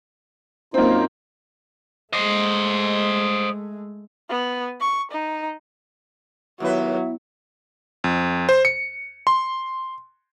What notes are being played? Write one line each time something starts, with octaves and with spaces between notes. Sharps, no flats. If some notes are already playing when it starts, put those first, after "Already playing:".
F#2 A#3 C4 D#4 F4
G#3 A3 C5 D#5
B3
C#6
D#4
D#2 A2 F#3 B3 E4 B4 E5
F2
C5
C#7
C6